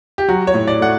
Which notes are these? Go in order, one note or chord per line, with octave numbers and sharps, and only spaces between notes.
G4
F#3 F#4
C#5
A2
D5
A3 F#5